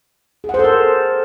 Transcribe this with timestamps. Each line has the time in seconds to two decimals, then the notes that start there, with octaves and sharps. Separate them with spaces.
0.44 G#4
0.49 F#5
0.54 C5
0.59 A4
0.64 A#4